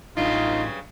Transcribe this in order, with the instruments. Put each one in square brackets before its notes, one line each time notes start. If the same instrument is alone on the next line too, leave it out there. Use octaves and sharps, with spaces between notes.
[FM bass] A1 [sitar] G2 C#3 F#3 [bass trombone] D#4 [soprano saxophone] F4